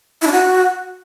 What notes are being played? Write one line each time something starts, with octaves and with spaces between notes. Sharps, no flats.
E4
D4
F#4